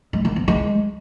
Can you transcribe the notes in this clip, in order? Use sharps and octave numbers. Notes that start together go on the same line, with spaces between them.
G#3
A#3
B3
G#3